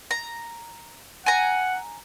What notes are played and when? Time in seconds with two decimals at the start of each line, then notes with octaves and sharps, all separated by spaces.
0.11 A#5
1.26 F#5 G#5 A#5